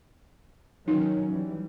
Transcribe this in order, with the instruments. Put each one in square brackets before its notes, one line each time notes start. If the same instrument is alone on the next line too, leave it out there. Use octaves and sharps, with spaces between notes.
[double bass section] D#3 F#3 C#4 [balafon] D#4
[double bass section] E3 G3